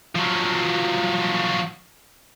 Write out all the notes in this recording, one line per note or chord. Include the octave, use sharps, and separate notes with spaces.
F3 F#3